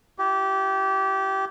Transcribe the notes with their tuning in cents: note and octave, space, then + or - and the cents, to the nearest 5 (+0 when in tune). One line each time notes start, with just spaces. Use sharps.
E4 +40 G4 -20